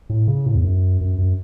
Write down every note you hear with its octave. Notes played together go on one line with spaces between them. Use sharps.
A2
C#3
A2
E2
F#2
F#2
F#2